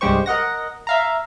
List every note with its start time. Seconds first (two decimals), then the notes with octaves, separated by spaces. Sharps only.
0.01 C2 G2 G#3 G4 C5 C#6
0.26 A#4 D#5 F#5 A#6
0.87 E5 F5 A#5